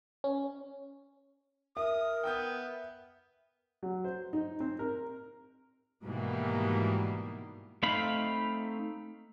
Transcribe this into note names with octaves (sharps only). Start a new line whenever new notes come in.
C#4
A#4 E5 D#6
B3 G5 D#6 G6
F#3
C5
D#4
C4
A#4
G#2 B2 D#3 E3 G3 A#3
A3 C4 D#4 F5 B5